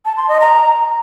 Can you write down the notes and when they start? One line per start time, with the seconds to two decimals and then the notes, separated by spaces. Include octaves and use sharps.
0.05 A5
0.17 C6
0.28 D#5
0.40 A#5